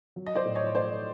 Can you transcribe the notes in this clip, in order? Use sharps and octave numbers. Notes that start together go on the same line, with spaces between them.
F#3
D#5
C5 D5
A2
C#5 D#5
C#5
A3 C5 D5